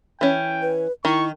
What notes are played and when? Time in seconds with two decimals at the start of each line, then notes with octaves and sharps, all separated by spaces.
0.21 E3 C#4 G5
0.62 B4
1.05 D#3 E4 C#6